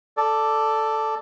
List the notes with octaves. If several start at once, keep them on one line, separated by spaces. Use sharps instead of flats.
A4 D5